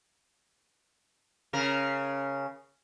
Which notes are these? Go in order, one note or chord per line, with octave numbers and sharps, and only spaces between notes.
C#3 A#4